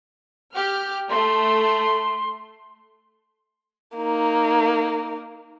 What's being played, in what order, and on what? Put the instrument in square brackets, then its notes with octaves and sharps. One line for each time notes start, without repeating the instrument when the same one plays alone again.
[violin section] G4 F6
[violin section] A3 [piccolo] C6
[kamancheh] A#3 D#4